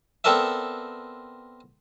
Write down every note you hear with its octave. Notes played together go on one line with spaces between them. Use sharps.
B3 C4 A4 A#4 D5 E5